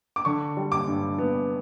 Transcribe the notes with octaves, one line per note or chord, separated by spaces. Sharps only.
D6
D3 C#6
G3
D6
G2
B3